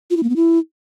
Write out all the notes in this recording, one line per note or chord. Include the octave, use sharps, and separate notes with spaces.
F4
E4
A#3
B3
E4